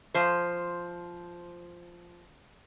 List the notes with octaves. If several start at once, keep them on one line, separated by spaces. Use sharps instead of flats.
F3 C5